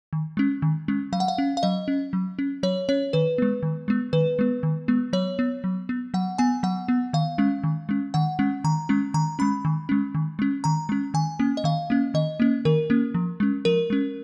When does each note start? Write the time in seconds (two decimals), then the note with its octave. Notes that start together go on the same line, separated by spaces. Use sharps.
0.13 D#3
0.37 G#3 C#4
0.62 D#3
0.88 G#3 C#4
1.13 F#3 F5
1.20 F#5
1.28 F5
1.38 C#4
1.57 F5
1.63 F#3 D#5
1.88 C#4
2.13 F#3
2.39 C#4
2.63 F#3 C#5
2.89 C#4 C#5
3.13 D#3 B4
3.38 G#3 B3
3.63 D#3
3.88 G#3 B3
4.13 D#3 B4
4.39 G#3 B3
4.63 D#3
4.88 G#3 B3
5.13 F#3 C#5
5.39 B3
5.64 F#3
5.89 B3
6.14 F#3 F#5
6.38 B3 G#5
6.63 F#3 F#5
6.88 B3
7.13 D#3 F5
7.38 G#3 C#4
7.64 D#3
7.89 G#3 C#4
8.14 D#3 F#5
8.39 G#3 C#4
8.64 D#3 A#5
8.89 G#3 C#4
9.14 D#3 A#5
9.39 G#3 C#4 B5
9.65 D#3
9.89 G#3 C#4
10.15 D#3
10.39 G#3 C#4
10.64 D#3 A#5
10.89 G#3 C#4
11.14 D#3 G#5
11.39 A#3 C#4
11.57 D#5
11.64 D#3 F5
11.90 A#3 C#4
12.14 D#3 D#5
12.40 A#3 C#4
12.65 D#3 A#4
12.90 A#3 C#4
13.15 F3
13.40 G#3 C#4
13.65 F3 A#4
13.90 G#3 C#4